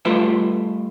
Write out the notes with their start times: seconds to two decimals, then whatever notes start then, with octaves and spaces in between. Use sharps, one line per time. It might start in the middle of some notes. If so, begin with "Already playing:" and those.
0.05 G3 A3 F4 B4 E5 G5